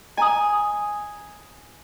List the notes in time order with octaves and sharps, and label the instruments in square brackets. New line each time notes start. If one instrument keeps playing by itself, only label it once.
[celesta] D#5 A#5 D#6 [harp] G#5